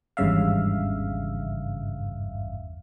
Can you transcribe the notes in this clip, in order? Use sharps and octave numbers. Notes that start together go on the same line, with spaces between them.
G#1 E2 G2 C#3 E5 F5